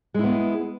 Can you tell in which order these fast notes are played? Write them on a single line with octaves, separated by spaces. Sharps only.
G#3 E4 B3